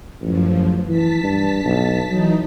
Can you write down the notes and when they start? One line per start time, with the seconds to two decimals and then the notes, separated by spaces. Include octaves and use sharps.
0.22 A1 F#2 F3
0.89 E3 A5 B6
1.23 G2
1.64 B1
2.11 E3 F#3 D#4